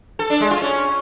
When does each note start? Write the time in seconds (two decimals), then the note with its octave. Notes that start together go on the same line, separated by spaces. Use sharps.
0.19 A4
0.30 D4
0.40 G#3
0.51 F4
0.62 C#4